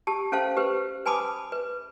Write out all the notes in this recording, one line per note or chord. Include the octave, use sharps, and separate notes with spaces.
G4 A5
C#4 A4 C5 F5 A5
G4 B4 C5
B4 G#5 A5 B5 D6 D#6
B4